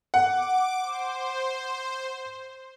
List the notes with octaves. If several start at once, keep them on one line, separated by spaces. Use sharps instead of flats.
F#5 D6
C5